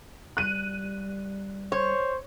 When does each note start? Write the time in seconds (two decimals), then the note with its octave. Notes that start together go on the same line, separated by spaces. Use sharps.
0.37 G3 F#6 D#7
1.72 C5 C#5